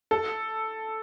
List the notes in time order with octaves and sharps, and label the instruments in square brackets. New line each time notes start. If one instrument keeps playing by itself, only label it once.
[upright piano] A4